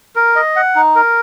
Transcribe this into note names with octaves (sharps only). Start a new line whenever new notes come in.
A#4
D#5
F#5
D#4
A#4